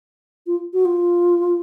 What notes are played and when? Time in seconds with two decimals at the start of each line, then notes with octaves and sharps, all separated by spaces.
0.47 F4
0.73 F#4
0.85 F4